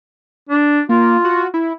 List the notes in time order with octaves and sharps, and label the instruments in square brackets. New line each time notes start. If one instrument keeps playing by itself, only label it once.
[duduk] D4
[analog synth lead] A#3 [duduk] F4
[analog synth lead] F#4
E4